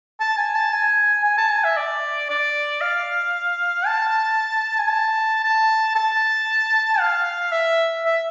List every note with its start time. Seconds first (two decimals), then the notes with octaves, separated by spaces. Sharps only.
0.20 A5
0.38 G#5
0.55 A5
0.73 G#5
1.24 G#5
1.38 A5
1.51 G#5
1.64 E5
1.77 D5
2.30 D5
2.82 F5
3.86 A5
4.79 G#5
4.90 A5
5.44 A5
5.96 A5
7.00 F5
7.52 E5
8.05 E5